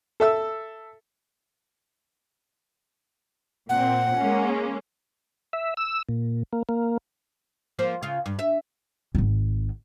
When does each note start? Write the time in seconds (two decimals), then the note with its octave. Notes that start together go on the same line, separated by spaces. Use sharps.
0.20 A4 E5 E6
3.69 A#2 C4 F#5
4.15 G#3 A#3 C#4
5.53 E5
5.77 E6
6.09 A#2
6.53 A#3
6.69 A#3
7.79 F3 A#3 C5
8.03 C#3 F4
8.26 G2
8.39 E5
9.15 D#1 G#1